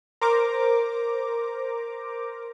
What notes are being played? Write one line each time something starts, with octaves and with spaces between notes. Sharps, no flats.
A#4 C5 A#5 D6